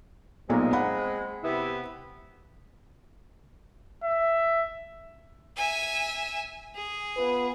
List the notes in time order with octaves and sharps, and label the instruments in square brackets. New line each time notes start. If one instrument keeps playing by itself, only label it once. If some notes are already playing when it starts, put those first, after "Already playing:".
[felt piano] B1 A#2 A#5 [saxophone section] G#3 C4
[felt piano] F#5 B5
[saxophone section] C3 B3 E4
[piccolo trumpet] E5
[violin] E5 G#5
G#4
[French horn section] B3 F4 B4